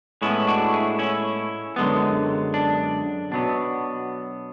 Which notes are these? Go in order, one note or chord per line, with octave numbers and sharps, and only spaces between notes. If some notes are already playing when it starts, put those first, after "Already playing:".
A2 G#3 B3 C#4 E4
D4 F#4
E4 G#4
C#4 E4
F#2 D3 G#3 B3
D4
B2 F#3 B3 D4